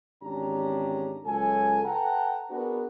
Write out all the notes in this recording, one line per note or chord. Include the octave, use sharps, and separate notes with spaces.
G#1 E2 C#4 D4 G4 A#5
C#2 F#3 A4 G#5
A4 B4 F#5 G5 A5 A#5
B3 D4 F#4 G#4 A#4 B4